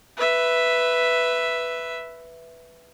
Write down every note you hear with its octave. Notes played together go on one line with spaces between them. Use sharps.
B4 E5